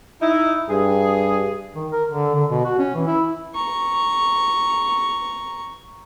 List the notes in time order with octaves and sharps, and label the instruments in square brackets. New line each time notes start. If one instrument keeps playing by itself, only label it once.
[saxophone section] D#4 E4
[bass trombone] G2 [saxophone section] G#4
[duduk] D#3
A#4
D3
D3
B2
F#4
C#4
E3
E4
[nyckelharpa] A#5 C#6